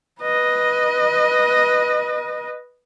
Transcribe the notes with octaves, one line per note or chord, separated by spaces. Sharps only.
B4 D#5